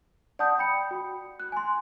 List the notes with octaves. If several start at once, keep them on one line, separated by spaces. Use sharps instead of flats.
D5 F#5 A5 D#6 G6
G5 B5 C#7
F#4
F#6
G#5 C6